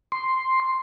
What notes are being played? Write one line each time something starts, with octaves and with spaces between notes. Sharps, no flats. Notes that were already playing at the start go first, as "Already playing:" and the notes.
C6